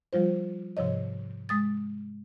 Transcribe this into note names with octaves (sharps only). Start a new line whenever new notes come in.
F3 G3 F4 C5
G#2 C3 F3 C#5 D#5
G#3 D#6 A6